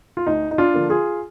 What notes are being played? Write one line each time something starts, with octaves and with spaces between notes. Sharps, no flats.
F4
D2 D#4
D#4
D4 F4
D3 F3 A#3
F4 G#4